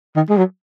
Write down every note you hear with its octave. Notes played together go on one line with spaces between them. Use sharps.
D#3
G#3
F#3